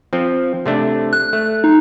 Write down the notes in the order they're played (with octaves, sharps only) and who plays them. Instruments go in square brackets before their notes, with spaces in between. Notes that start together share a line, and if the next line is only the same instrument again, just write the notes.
[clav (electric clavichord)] F3 C4
C3 A3 D4
[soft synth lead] F#6
[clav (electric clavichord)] A3
[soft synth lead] D#4